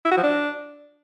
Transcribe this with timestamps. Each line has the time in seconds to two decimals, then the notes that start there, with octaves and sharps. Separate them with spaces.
0.05 E4
0.11 F#4
0.17 F3
0.23 D4